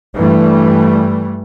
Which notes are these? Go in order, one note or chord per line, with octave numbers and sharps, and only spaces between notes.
G2 E3 G3 A3